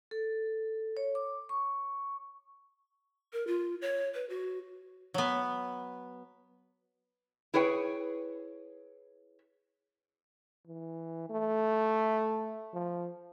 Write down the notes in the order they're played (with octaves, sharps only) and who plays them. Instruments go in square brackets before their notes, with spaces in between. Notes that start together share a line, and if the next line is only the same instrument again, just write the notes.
[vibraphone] A4
C#5
D6
C#6
[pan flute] A#4
F4
C#5
B4
F#4
[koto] F#3 B3
[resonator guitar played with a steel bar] E4 G#4 B4 C#5 G5
[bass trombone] E3
A3
F3